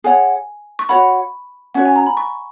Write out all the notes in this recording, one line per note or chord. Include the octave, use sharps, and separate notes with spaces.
G#4 C#5 F#5 G#5
C#6
F#4 C#5 F#5 B5
C#4 F#4 C#5 F#5
G#5
A#5
B5
C#6